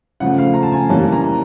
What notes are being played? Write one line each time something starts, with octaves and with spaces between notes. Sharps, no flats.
C#3 F3 A3 F#5
F5
A#5
A5
G#5
E3 G3 A#3 C#4 A5
A#5